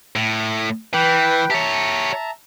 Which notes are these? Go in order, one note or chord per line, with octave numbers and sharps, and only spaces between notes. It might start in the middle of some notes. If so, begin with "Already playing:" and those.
A2
E3 B4 G5
G4 C#5 E5 A5 A#5